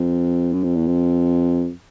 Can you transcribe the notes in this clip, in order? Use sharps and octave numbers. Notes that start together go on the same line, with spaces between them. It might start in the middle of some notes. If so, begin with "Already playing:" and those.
Already playing: F2
F#2
F2
E2
F2